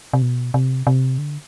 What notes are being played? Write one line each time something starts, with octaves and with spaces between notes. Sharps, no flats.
C3
B2
C3
C3
D3